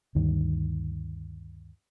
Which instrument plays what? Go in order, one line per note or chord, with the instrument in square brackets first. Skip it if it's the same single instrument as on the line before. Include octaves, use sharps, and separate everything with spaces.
[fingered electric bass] D2 G2 D#3